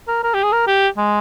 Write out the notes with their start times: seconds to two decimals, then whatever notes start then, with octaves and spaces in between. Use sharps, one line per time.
0.08 A#4
0.24 A#4
0.34 G4
0.44 G#4
0.53 A#4
0.67 G4
0.98 G#3